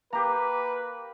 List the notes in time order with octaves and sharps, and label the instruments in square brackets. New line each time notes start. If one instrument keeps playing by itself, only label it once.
[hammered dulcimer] A#3 G4 [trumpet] B4 [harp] A#5